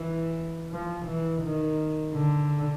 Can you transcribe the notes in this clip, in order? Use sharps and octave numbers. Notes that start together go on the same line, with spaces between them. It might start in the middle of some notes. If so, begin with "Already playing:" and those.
Already playing: E3
F3
E3
D#3
D3